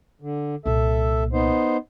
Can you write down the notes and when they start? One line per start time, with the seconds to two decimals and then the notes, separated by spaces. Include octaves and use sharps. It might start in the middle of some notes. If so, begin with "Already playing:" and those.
0.22 D3
0.65 C2 A#2 A4 E5
1.33 B3 D#4 C5